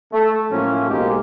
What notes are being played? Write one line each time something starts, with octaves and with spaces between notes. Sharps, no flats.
A3
A2 F3 F#3 A#3 C#4
B1 G#2 G#3 A#3 G4